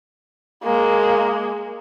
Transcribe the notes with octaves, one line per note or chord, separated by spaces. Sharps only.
G#3 A#3